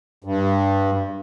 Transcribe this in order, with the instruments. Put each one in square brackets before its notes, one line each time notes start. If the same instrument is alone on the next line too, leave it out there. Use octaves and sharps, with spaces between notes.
[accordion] G2